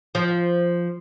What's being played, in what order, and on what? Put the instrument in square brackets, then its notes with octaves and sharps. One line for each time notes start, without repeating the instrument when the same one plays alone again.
[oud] F3